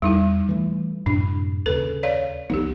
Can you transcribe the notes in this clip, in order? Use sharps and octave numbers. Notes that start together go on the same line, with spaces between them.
E2 G3 D#4 E4
E3 A3
F#2 A2 C3 D4
D#2 C#3 A4 B4
C#5 D5 F5
C#2 F3 B3 D#4 G4